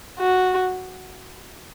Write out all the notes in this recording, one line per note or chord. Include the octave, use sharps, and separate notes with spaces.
F#4